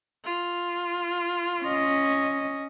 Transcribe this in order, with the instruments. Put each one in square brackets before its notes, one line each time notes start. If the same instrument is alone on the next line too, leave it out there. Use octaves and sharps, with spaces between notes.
[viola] F4
[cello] C#4 D#5